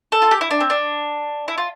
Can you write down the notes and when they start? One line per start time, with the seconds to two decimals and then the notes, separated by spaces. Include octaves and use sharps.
0.12 A4
0.22 F4
0.31 G4
0.41 E4
0.51 D4
0.60 C4
0.70 D4
1.48 E4
1.58 F4